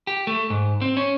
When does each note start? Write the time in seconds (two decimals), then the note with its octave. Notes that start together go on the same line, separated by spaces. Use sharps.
0.07 G4
0.27 A3
0.50 G#2
0.82 C4
0.97 C#4